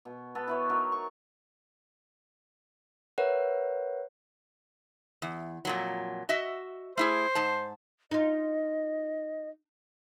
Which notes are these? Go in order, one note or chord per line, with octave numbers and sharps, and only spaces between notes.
B2
B3 A4 B4
E4 B4 C#5
F#3 D#4 A#4
C#6
A#4 B4 C#5 E5 F#5 F#6
E2
F2 A#2 F#3
F#4 D#5 E5
A3 E4 G#4 C5
G#2 A5
D#4 F4 D#5